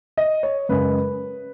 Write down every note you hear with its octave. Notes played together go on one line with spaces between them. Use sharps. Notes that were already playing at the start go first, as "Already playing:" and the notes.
D#5
C#5
F#2 C#3 G#3 B4